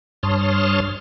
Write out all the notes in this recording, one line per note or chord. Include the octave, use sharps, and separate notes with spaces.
G2 C#5 A5 C6 D#6 F6